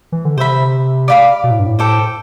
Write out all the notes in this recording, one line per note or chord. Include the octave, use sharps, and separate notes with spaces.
E3
D3
C3 C5 E5 B5
D5 F5 B5 D6
B2
A2
G2
A2
A4 C5 G5 D6